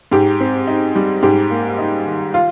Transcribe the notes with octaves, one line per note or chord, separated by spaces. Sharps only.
G#2 G4
C4
D#4
G3
G#2 G4
A#3
D#4
D#3
F4